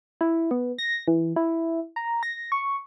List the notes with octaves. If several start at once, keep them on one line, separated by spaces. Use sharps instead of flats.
E4
B3
A#6
E3
E4
A#5
A#6
C#6